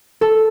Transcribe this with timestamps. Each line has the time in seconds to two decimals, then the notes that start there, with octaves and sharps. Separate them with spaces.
0.21 A4